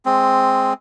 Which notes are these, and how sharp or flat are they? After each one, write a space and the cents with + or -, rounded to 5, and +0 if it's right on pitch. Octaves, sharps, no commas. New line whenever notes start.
G#3 +0 C4 +0